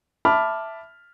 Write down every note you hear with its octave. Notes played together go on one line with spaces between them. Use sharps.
E5 A5 B5 D6 F6